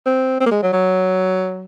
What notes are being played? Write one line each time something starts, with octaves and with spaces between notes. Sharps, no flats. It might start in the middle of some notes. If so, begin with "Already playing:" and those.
C4
C4
A#3
G#3
F#3
F#3